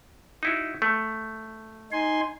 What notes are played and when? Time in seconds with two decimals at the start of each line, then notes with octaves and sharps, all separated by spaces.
0.43 D#4 E4 F#4
0.82 A3
1.92 D#4 G#5 C6